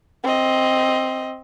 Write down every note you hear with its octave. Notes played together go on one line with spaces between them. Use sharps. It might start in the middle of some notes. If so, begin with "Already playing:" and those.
C4 D#5